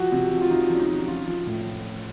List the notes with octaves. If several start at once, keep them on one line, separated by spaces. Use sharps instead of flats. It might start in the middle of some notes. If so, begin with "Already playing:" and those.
Already playing: F3 F#4
C3
F3
F4
F3 D#4
F3
C#4
D#4
F3
F3 F4
F3
A2